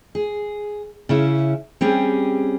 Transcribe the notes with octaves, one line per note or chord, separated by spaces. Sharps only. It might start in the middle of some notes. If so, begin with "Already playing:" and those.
G#4
C#3 C#4 E4
G3 C4 C#4 G4 G#4